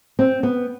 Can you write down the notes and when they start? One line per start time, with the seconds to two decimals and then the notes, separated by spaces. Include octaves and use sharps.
0.19 C4
0.43 B3